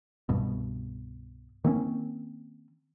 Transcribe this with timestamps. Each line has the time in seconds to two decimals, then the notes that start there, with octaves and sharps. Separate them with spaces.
0.29 C2 G2 B2
1.64 D#3 A#3 C4 C#4